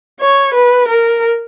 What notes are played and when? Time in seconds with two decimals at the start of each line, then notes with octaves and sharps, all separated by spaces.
0.20 C#5
0.54 B4
0.88 A#4